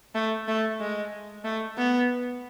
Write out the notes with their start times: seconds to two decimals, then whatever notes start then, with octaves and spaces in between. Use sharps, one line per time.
0.15 A3
0.48 A3
0.81 G#3
1.44 A3
1.78 B3